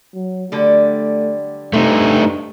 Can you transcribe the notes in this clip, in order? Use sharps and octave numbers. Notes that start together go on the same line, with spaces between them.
F#3
D3 F#3 G3 A3
G2 C3 A3 D#4 C5